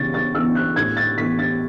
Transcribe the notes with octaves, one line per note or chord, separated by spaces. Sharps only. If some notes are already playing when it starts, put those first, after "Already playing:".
Already playing: C#3 E3 B3 D4 A6
A6
E3 B3 D4 E6
F#6
A2 G#6
A6
E3 B3 D4 B6
A6